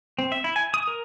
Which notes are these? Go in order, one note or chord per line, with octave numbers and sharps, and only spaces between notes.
C4
E5
E4
G#5
D#6
A#4